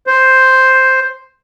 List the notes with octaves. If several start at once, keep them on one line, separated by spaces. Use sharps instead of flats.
C5